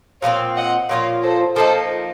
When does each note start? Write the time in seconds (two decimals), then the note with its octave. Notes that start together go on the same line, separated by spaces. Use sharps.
0.22 A#2 F3 A3 C4 C#5 F5
0.56 D#5 F#5
0.89 A#2 F3 A#3 F4 C#5 F5
1.23 A4 C5
1.56 F3 A#3 D#4 A4 C5